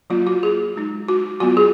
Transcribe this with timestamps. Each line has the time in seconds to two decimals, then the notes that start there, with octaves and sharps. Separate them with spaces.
0.10 F#3 A#3 F4
0.27 F#4
0.43 G#4
0.76 G#3 D#4
1.08 F#4
1.40 F#3 B3 F4 F#4
1.57 G#4